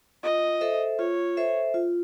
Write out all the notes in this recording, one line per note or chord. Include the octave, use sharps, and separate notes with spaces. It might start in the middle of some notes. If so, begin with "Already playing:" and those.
F4 D#5
A4 C5 E5
F4 C#5
A4 C5 E5
F4